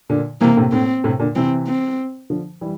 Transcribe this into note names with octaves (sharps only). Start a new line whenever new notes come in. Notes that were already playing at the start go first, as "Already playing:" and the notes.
A#2 D3
C3 E3 A#3
A2 C3
A2 C4
A2 C3
A#2 D3
C3 E3 C4
C4
D3 F3
E3 G3